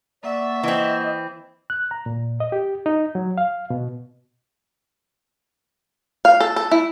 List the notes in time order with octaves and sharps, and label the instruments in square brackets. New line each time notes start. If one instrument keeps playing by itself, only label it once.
[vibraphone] A#3 F#5 C#6 [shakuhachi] D5 [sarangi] E5
[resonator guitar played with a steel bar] E3 C4 [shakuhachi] D#5
[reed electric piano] F#6
A#5
A#2
D#5
G4
D#4
F#3
F5
B2
[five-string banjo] F5
A4
A4
E4